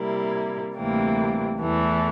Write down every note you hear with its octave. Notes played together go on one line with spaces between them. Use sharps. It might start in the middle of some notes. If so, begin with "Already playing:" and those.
Already playing: C3 G3 A#3 E4
D2 C3 E3 G3 A#3
E2 E3 A3